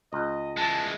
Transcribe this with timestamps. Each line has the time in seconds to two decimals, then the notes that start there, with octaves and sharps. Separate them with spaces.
0.13 C#2 D#5
0.57 E3 G#3 A5